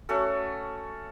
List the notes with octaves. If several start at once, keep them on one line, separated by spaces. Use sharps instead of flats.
A3 C#4 F#4 A4